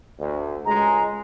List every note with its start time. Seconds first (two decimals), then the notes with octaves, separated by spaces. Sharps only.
0.19 D2
0.66 C#2 G#3 A#5